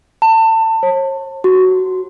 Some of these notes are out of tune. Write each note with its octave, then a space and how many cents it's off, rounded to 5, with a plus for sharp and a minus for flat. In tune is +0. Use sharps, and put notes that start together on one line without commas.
A5 +30
C#5 -45
F#4 +10